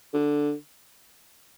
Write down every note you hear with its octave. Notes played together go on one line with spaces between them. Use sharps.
D3